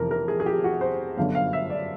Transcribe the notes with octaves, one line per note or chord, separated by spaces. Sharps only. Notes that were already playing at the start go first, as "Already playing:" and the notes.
Already playing: F1 F2 C3 E3 A#4
A#4
G#4
G#4
G4
F#4
C5
G1 F#2 D3 F5
F5
E5
D5